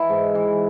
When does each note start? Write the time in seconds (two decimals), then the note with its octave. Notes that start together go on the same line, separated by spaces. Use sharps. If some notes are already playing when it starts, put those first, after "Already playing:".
Already playing: E3 E4
0.09 G#2
0.35 E3